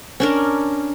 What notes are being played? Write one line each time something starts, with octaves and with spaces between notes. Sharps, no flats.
C#4 D4 A#4